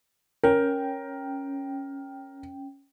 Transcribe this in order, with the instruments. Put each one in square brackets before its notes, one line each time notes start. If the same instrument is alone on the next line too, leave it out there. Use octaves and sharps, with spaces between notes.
[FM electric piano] C#4 G5 [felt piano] A#4